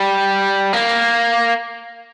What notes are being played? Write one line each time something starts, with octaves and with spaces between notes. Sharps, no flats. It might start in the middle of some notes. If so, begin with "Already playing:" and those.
Already playing: G3
A#3